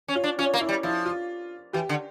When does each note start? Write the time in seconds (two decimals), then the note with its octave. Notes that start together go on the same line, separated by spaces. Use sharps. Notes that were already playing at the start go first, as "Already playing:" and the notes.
0.08 C#4
0.15 F4
0.24 D4
0.38 C#4 F4
0.54 A#3
0.60 E4
0.69 G3
0.83 F3 E4
1.06 F4
1.73 E3 G4
1.89 D3